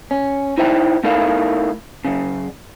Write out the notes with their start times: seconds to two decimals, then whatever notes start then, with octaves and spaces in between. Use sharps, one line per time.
0.11 C#4
0.58 D#4 E4 C5 E5 G5
1.03 A3 D#4 E4 A4 A#4 F5
2.05 F#2 C#3